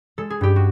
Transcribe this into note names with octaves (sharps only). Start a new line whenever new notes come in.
G#3 A4
G#4
G2 G4
F#4